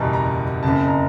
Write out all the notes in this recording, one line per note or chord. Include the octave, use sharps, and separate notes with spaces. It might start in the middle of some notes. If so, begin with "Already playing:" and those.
Already playing: F#1 E2 B2 G3 A5 A#5
A#5
F#1 F2 C#3 A5
A#5